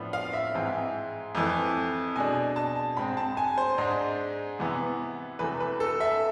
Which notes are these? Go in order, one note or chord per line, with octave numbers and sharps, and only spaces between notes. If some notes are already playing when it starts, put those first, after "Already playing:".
Already playing: A2 F3 B3 D4
F5
E5
G#2 E3 G#3 C4
F2 E3 A3
B2 G#3 D4 G#5
A5
G#2 G#3 C4 B5
A5
G#5
C5
G#2 G#3 D4
C3 E3 B3
E2 C3 E3 A3 B4
B4
A4
E5